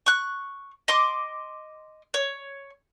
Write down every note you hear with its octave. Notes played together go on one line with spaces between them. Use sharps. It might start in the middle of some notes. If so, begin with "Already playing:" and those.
C#6 F#6
D#5 C6 D6
C#5